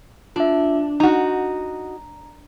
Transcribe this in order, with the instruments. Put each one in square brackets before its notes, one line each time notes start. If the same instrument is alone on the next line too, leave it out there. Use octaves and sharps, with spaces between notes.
[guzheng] D4 [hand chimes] F4 E5
[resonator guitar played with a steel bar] D#4 F#4 [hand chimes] A#5